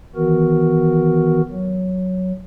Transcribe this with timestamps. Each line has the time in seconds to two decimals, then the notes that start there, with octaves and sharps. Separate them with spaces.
0.15 D#3 E3 B3 F#4 A#4
1.51 F#3